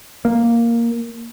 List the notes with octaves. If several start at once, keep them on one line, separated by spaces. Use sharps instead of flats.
A#3